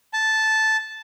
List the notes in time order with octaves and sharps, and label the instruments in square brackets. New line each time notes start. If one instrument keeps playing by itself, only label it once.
[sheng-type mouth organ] A5